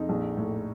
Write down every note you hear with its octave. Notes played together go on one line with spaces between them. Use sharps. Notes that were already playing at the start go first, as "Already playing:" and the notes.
Already playing: F2 D#4
A#1
A2